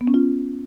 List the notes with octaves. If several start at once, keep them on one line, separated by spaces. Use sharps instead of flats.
B3
C#4
F4